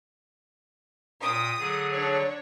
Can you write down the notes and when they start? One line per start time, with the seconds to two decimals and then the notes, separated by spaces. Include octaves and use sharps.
1.22 A#2 G5 D#6
1.59 D3 F#3 G#4
1.91 D4 C#5